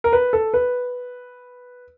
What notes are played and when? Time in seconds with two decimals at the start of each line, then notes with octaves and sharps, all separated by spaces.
0.04 A#4
0.13 B4
0.33 A4
0.54 B4